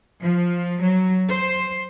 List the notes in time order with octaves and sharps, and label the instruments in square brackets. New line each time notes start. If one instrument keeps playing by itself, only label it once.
[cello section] F3
F#3
C5